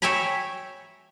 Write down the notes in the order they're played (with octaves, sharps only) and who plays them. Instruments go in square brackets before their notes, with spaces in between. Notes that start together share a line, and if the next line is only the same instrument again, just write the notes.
[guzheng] C#5 E5 G5 G#5 A#5 B5